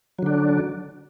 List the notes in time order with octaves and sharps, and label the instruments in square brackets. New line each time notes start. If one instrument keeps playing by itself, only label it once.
[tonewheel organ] F#3
D3
D4